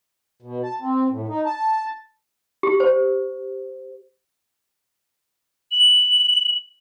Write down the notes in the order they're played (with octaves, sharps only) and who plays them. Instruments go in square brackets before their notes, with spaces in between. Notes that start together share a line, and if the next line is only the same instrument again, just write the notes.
[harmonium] B2
A5
C4
A2
D#4
A5
[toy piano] G4
C5
[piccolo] F#7